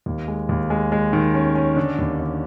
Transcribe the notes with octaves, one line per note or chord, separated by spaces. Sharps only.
D#2
G#3
D#2
G#3
G#3
D#3
C#4
C#4
D3
D#2
D3